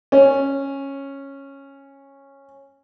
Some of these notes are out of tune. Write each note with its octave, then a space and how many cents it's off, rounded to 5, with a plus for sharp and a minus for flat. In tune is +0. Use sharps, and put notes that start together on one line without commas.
C#4 -10